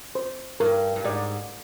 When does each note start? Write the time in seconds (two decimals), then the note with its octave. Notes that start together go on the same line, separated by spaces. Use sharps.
0.15 C5
0.60 G2 A#4
0.96 G2
1.04 G#2 D5